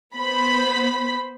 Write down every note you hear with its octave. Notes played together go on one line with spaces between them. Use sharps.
B3 C5 B5 B6